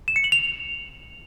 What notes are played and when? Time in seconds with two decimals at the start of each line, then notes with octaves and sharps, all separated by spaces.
0.08 E7
0.16 C#7
0.24 F#7
0.32 F7